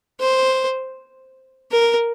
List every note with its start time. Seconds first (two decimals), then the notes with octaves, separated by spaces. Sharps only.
0.21 C5
1.72 A#4